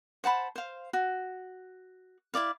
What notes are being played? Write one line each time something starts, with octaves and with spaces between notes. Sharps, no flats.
C5 F#5 A5 B5
C5 F5
F#4
E4 F4 D5 F5